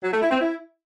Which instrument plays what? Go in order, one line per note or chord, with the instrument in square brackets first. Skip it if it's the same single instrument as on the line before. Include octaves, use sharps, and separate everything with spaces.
[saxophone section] F#3
A3
E4
C4
E4